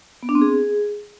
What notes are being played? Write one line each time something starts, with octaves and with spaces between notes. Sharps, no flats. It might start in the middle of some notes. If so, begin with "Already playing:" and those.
B3
D4
C4
G#4